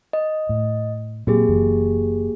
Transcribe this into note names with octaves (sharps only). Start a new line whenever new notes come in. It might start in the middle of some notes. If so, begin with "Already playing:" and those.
D#5
A2
A#2 F#3 A#3 C4 G4 G#4
F#1 F#2 E3